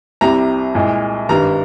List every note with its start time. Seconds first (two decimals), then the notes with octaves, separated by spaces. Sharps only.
0.21 C2 C3 G3 A#5
0.75 C2 A#2 G#3
1.29 G#1 G2 D#3 G3 A#5